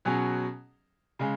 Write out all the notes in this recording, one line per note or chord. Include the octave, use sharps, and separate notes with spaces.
B2 F#3 C#4 G#4
C#3 G#3